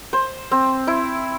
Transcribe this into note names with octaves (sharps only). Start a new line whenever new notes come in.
C5
C4
E4